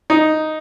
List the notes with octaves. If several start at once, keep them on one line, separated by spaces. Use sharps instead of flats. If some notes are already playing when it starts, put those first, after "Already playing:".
D#4